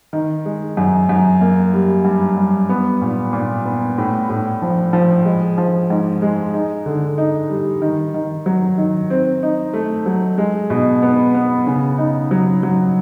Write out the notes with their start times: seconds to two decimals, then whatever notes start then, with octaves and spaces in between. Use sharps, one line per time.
0.13 D#3
0.46 G#3
0.77 F#2
1.09 F#2
1.41 A#3
1.73 G3
2.05 G2
2.37 G2
2.69 B3
3.02 A#2
3.33 A#2
3.65 B3
3.98 A2
4.29 A2
4.62 F3
4.93 F3
5.25 G#3
5.58 F3
5.90 G#2
6.22 G#3
6.54 D#4
6.86 D3
7.18 D#4
7.50 G3
7.82 D#3
8.14 D#3
8.46 F#3
8.78 D#3
9.10 C4
9.43 D#4
9.74 A3
10.06 F#3
10.38 G#3
10.70 B2
11.02 B3
11.35 B3
11.67 C#3
11.98 D#4
12.31 F#3
12.63 F#3